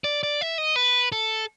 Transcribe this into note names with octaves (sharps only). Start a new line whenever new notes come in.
D5
D5
E5
D#5
B4
A4